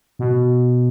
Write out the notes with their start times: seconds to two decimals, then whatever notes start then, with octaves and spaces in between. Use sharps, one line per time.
0.19 B2